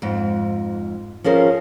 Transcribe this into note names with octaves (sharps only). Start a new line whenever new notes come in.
F2 G#2
F3 C#4 G#4 A#4 C5